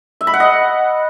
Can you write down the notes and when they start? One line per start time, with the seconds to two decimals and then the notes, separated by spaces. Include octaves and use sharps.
0.21 E5
0.27 B5
0.34 F#5
0.40 D#5